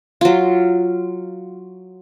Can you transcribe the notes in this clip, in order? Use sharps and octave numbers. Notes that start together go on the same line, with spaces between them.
F#3 F4